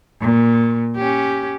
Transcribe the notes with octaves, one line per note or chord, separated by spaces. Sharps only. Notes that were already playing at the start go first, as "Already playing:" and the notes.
A#2
C#4 G4